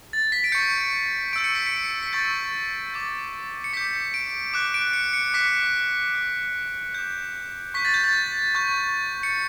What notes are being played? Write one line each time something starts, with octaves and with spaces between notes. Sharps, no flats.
A6
B6
D7
C#6 G6 C#7
C#6 E6 G6 D7
C#7
B6
C#7
C#7
B6
C#6 E6 G6 A6
D6 G6
C#7
D6 G6 B6
D7
D6 F#6
D7
C#7
C#7
D6 F#6 B6
D6 G6
D6 G6
C#6 G6 B6
A6
G6
A6
C#6 G6
C#7